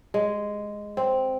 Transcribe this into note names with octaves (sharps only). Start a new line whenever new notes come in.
G#3
C4